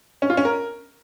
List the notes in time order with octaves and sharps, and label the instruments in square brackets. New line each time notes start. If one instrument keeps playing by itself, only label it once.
[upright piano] C#4
F4
C#4
A#4